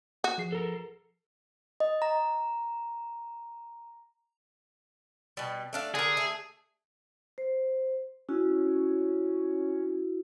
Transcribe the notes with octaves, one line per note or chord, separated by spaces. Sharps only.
F#4
F3 G#4 C7
A4 A#4
D#5
A#5
B2 G3
A3 D4 F5
D3 G#4 A#4
A3
C5
C#4 E4 F#4